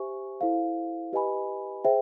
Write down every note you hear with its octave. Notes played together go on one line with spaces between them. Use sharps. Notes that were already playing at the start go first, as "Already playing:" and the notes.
Already playing: G4 C5 E5 G#5 C#6
E4 A4 C5 F5
G4 B4 D#5 G#5 B5
G#4 C5 E5 G5